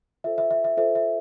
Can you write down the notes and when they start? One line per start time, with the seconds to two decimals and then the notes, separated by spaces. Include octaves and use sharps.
0.24 F4 A4 C5 E5
0.38 E5
0.51 E5
0.64 E5
0.77 F4 A4 C5 E5
0.95 E5